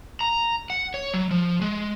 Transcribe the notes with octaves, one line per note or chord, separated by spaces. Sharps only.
A#5
F#5
C#5
F#3
F3
G#3